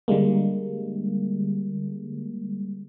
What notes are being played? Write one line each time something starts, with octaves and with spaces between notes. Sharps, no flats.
D3 G3 G#3 A#3